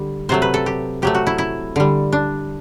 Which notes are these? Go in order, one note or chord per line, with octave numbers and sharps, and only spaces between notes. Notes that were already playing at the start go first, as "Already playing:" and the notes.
Already playing: D3 G3
C3 F#3 A3 C5
B4
A4
G4
C3 F#3 A3 G4
F#4
E4
E4
D3 G3
D4